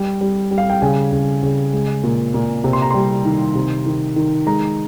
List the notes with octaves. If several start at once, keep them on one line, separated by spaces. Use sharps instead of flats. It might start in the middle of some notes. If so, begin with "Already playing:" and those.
Already playing: G3
G3
G3
F5
G5
C#3 G#5
C#3
C#3
G#3
A#2
A#2
C3
C6
A#5
G3 C6
D#3
C3
D#3
D#3
G#3 A#5